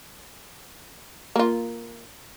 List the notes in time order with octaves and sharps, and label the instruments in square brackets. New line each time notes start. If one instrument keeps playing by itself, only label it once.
[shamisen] A#3 F4